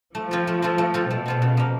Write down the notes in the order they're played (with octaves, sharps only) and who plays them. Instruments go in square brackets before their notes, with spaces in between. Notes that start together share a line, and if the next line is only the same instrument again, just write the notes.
[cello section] F3 [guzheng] A3
[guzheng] C4 F4 A4
A3
C4 F4 A4
A3
C4 F4 A4
[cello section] B2 [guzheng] A3
[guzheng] C4 F4 A4
C#3
F3 A#3